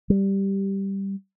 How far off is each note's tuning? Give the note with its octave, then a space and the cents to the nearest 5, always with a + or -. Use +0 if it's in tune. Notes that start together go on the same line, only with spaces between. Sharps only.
G3 +0